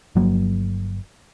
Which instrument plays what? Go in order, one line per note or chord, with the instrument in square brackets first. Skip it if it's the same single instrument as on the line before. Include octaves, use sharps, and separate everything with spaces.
[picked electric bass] G1 F3 F#3 A#3